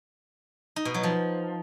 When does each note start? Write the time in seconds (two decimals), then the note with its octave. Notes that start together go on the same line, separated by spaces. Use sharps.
0.76 D#4
0.85 B2
0.94 F#3
1.03 F3